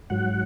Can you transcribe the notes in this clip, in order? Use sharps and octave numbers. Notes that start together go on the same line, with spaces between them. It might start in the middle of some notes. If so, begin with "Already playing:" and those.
G#2 F#3 F#5